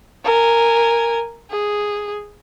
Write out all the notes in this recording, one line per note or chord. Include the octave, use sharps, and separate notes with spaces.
A#4 G#5
G#4